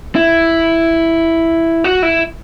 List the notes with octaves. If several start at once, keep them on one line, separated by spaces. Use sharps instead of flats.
E4
F#4
E4